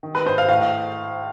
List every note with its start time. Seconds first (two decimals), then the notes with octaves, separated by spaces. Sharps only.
0.03 D#3
0.15 B4
0.26 G#2 C5
0.38 F5
0.48 A2 F5